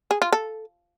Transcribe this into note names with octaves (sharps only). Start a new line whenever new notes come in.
G#4
F4
A4